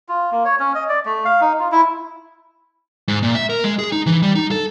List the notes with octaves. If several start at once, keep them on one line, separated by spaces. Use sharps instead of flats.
F4
A#3
C#5
C#4
D#5
D5
A3
F5
D#4
F4
E4
G#2
A#2
E5
A#4
G#3
G#4
D#4
E3
G3
D#4
A4